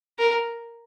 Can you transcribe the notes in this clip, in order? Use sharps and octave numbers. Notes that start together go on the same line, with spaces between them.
A#4